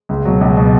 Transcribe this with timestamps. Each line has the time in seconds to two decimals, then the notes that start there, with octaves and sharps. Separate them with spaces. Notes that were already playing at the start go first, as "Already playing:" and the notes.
0.09 C#2
0.25 B2 F#3
0.41 C#2
0.57 B2 F#3